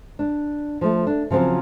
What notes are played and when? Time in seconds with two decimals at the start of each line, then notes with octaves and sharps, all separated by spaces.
0.19 D4
0.81 F3 A3
1.07 D4
1.30 C#3 F3 F#3 C4